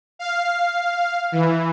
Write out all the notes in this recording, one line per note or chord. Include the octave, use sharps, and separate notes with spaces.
F5
E3